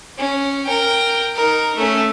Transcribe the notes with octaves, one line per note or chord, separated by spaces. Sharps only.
C#4
A#4 G5
D#4 A#4
A3 C#4